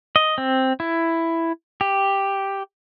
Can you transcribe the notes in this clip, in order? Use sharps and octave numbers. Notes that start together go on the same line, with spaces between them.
D#5
C4
E4
G4